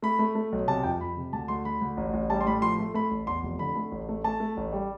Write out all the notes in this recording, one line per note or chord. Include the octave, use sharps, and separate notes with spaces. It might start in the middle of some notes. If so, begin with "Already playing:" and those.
A3 B5
A3
A3
B1
C3 A5
F2 G5
F2 B5
C3
D2 A5
D2 C6
D2 B5
D2
A1
A1
G3 A5
C6
A2 B5
F3 C6
A3
A3 B5
A1
E2 C6
F1
D3 B5
A3
A1
A3
A3 A5
A3
A1
G3